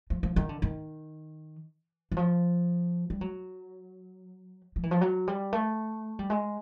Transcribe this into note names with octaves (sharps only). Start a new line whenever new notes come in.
F3
F3
D#3
D3
D#3
E3
F3
G3
F#3
F3
E3
F3
F#3
G3
A3
G3
G#3